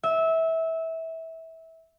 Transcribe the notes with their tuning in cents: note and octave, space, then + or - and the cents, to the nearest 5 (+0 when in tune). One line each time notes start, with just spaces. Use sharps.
E5 -20